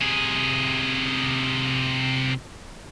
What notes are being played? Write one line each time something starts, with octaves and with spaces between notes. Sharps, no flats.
C3 G#4